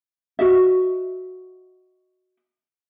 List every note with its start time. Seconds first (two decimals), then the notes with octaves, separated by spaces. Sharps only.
0.39 F#4 D#5 E5